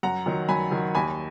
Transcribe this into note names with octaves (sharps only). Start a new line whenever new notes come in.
F#2 F#5 A#5
D#3 F#3
F#2 G#5 B5
D#3 F#3
D#2 G#5 B5